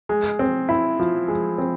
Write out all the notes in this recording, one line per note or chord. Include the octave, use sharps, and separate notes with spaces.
G#3
C4
E4
F3
G#3
C4